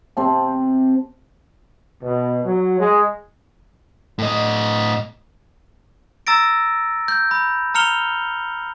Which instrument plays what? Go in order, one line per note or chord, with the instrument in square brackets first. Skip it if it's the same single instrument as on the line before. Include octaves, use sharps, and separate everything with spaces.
[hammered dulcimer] C3 C4 A5
[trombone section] B2
F#3
G#3
[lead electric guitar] A2 D#5
[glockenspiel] A#5 E6 A6 A#6 D7
G6
B5
A#5 F6 C#7 F7 G7